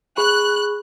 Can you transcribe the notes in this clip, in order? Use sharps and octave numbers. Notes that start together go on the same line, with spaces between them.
G#4 B5 C#6 F#6